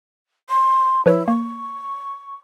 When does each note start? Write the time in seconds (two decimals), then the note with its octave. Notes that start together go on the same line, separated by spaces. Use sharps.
0.49 C6
1.06 F3 E4 B4 C#5
1.28 A#3 C#6